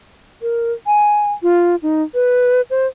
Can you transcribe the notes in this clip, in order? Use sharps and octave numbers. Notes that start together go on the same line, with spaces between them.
A#4
G#5
F4
D#4
B4
C5